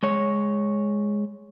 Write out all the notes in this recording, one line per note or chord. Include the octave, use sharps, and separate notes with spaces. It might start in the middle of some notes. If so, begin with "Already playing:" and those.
G#3 C#5